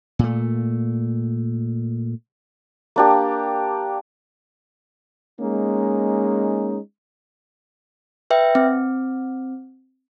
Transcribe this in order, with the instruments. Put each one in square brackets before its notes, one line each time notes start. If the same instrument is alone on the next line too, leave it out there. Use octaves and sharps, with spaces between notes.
[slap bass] A#2 A3
[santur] A#3 D4 G4
[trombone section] G#3 A#3 C#4 D#4
[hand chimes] B4 E5 G5
C4